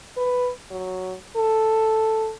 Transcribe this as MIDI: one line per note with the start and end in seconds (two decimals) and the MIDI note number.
0.17 0.50 71
0.71 1.15 54
1.36 2.32 69